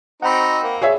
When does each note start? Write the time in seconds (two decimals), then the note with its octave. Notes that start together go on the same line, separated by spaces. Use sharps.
0.22 C4 D#4 F#4 F#5 G5 B5
0.63 A#3
0.82 G#4 C#5 E5